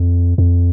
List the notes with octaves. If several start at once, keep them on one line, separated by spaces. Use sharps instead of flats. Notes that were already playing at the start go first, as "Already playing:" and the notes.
Already playing: F2
F2